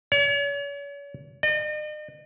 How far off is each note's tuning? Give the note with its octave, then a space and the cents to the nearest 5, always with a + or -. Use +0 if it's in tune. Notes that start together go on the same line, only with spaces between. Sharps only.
C#5 +40
D#5 -45